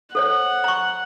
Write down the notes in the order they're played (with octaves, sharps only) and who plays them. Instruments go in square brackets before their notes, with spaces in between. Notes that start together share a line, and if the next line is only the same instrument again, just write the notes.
[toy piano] A4 C5 C#5 [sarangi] F#5
[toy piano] A#5 C#6